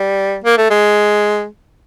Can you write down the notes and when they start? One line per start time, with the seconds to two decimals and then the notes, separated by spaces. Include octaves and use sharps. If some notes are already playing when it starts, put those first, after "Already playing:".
Already playing: G3
0.44 A#3
0.57 A3
0.70 G#3